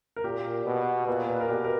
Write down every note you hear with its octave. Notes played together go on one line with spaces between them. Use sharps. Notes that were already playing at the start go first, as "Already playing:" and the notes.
A#4
A#2 G4
B2
A#2 B4
B4
A#4
B2 G4
A#4